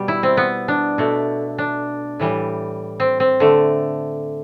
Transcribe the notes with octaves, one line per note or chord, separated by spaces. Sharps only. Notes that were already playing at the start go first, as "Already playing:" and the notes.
Already playing: B2 G3
E4
C4
B3
D4
B2 A3
D4
A2 E3 G3
C4
C4
D3 A3